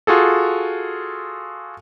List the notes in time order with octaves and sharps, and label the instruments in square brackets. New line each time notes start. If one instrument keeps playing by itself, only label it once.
[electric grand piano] F4 F#4 G#4 A4